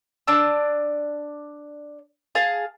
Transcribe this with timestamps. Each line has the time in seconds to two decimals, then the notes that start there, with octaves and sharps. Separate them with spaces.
0.27 D4 D5 A5 E6
2.35 G#4 F5 A5